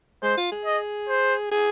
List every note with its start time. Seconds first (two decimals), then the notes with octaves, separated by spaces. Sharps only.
0.23 G#3 C5
0.37 F4
0.52 G#4
0.65 D#5
1.09 C5
1.52 G#4